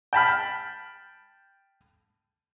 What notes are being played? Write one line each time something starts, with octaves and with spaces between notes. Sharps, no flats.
G5 A5 B5 F6